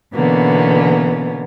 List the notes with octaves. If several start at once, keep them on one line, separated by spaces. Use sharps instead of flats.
B2 D3 E3 A#3 B3 C#4